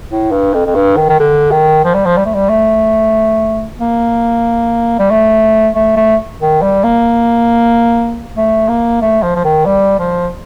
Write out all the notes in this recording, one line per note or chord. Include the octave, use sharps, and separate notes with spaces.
A2
G2
F2
F2
G2
D#3
D#3
D3
D#3
F3
G3
F3
G3
A3
G3
A3
A#3
G3
A3
A3
A3
D#3
G3
A#3
A3
A#3
A3
F3
F3
D#3
G3
F3